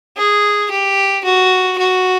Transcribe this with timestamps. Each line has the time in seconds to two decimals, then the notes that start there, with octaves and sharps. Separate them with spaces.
0.17 G#4
0.71 G4
1.24 F#4
1.78 F#4